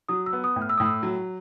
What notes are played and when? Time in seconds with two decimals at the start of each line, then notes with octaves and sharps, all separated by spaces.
0.09 F#3 D#6
0.26 E6
0.33 B3
0.44 D#6
0.56 A2
0.62 F6
0.69 E6
0.78 A2 D#6
0.85 E6
1.03 F#3